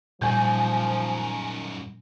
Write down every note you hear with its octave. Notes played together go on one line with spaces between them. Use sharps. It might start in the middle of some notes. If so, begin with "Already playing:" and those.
F#2 A#2 D#3 F3 G3 G#5 G6